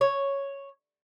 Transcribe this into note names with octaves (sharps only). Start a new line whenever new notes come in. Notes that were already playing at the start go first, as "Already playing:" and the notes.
C#5